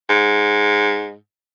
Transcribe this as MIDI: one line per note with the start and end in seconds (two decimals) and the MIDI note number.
0.10 1.15 44